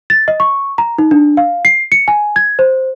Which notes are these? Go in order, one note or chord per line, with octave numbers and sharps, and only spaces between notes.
A6
D#5
C#6
A#5
D#4
D4
F5
C7
C#7
G#5
G#6
C5